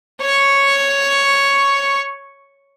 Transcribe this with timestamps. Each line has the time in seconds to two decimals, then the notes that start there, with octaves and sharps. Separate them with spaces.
0.21 C#5 C#6